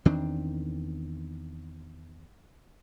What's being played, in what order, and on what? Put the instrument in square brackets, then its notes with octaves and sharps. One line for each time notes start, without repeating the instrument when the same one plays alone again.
[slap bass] E2 D#3 C4 D4